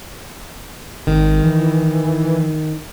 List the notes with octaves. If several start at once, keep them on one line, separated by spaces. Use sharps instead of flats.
G#1 D#3
E3